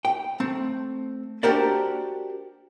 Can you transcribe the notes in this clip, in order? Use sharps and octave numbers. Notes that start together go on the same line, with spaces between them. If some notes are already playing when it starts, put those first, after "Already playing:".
G5
A3 C4
D4 F#4 G4 A#4 C5 D5